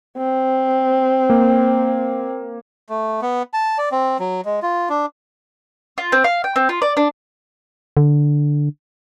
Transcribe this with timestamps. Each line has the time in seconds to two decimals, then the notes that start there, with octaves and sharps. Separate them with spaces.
0.17 C4
1.30 A#3
2.89 A3
3.22 B3
3.53 A5
3.78 D5
3.92 C4
4.19 F#3
4.45 G#3
4.62 F4
4.89 D4
5.98 F4
6.12 C4
6.24 F5
6.44 G5
6.56 C4
6.69 F4
6.82 D5
6.97 D4
7.97 D3